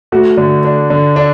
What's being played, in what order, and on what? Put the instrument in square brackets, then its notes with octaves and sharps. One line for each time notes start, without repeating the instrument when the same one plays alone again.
[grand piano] A3 [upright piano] F#4
[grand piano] D3
D4
D3
D4